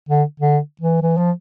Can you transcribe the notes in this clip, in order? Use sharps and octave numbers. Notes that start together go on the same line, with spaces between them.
D3
D3
E3
E3
F3